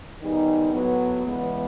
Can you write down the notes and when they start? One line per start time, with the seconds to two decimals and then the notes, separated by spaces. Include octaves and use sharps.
0.21 D#3 G3 B3 D#4 G#4
0.73 A2 F#3 B3
1.25 E2 C#3 E3 G#3 B3